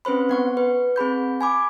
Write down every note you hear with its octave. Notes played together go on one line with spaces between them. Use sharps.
C4 C#4 B4 C5 B5
B3 F#5 C#6
B4
C4 G#4 B5 G6
G#5 B5 D6